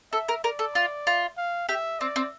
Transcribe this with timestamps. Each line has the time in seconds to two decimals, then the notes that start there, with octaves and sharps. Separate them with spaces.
0.12 A4 E5
0.28 A#4
0.44 A#4 D5
0.59 A4
0.75 F4
1.07 F4
1.37 F5
1.69 G4 E5
2.00 C4 D5
2.16 C4